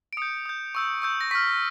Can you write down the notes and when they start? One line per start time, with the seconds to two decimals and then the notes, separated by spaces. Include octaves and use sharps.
0.13 D7
0.17 D#6 G6 C#7
0.46 D#6 G6
0.75 C#6 E6 G6
1.02 C#6 E6 G6
1.21 A#6
1.31 C#6 F6 B6